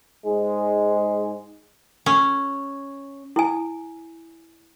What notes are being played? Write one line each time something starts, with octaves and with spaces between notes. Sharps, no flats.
G#2 G#3
C#4
E4 G#5